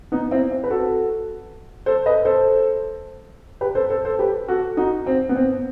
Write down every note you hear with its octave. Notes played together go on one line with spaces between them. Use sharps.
B3 D#4
C4 E4
C4
B4
F#4 A4
A4 C5
B4 D#5
A4 C5
G4 B4
A4 C5
A4 C5
A4 C5
G4 B4
F#4 A4
D#4 F#4
C4
B3
C4